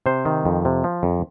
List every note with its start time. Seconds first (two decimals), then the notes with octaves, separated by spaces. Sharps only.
0.06 C3 C5
0.25 D#3
0.45 F2
0.65 C3
0.84 F3
1.03 F2